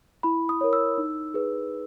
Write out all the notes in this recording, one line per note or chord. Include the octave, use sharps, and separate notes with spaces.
E4 B5
D#6
A#4 C#5
E6
D#4
G#4 B4